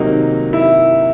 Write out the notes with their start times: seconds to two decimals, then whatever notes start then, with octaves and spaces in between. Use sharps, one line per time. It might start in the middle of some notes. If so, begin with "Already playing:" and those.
Already playing: C3 D#3 F#3 A#3 D#4
0.53 E4